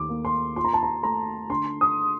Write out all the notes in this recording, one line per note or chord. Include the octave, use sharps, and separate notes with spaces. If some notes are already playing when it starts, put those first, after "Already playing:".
Already playing: D#2 A3 D6
A#3
C6
F4 C6
A#5
A5
A#5
A3 A#5
D3 C6
D#6